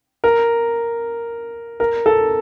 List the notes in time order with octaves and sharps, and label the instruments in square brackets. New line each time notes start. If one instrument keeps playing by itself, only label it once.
[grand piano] A#4
A#4
A4